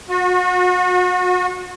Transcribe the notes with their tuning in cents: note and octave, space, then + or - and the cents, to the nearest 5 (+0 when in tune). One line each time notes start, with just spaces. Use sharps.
F#4 -35